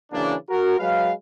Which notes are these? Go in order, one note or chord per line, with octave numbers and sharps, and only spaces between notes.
C#3 E3 F#3 A#3 D4
F#4 A#4
F#3 G#3 B4 F5